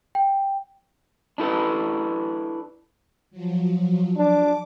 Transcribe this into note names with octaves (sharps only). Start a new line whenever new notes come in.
G5
D4 E4 A4 B4
F3 F#3
D4 D6